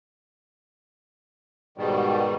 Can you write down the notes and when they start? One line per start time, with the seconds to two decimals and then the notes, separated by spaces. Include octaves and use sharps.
1.78 G#2 B2 D#3 G3